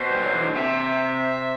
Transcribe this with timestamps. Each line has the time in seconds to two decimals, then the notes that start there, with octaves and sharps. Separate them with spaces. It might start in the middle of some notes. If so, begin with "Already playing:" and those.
Already playing: B2 C5
0.10 G3
0.22 F#3
0.33 E3
0.44 D3
0.55 C3 E5